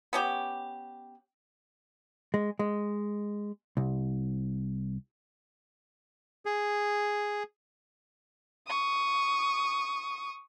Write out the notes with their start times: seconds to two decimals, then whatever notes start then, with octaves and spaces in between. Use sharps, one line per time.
0.13 B3 C#4 G4
2.34 G#3
2.59 G#3
3.77 C2
6.45 G#4
8.67 C#6 D#6